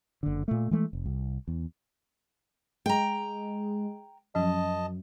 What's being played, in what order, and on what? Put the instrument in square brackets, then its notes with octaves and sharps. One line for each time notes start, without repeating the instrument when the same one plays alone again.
[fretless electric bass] F#1 D3
A#2 A3
E3 G#3 A3
F1
C2
E2
[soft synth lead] G#3 [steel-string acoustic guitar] G5 A#5
[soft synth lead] F#2 [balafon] F3 F#3 [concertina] D#5 A5